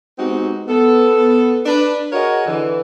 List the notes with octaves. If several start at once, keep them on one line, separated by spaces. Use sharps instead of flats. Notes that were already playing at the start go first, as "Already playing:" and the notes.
G#3 B3 C4 D#4 F#4 G4
B3 A4
D4 B4
F#4 G#4 A#4 C#5 D#5 F#5
D3 E3